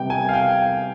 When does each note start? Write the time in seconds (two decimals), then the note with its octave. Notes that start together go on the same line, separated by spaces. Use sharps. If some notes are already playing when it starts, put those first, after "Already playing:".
Already playing: C3 G3 B3 G5
0.10 G#5
0.29 F5
0.33 G5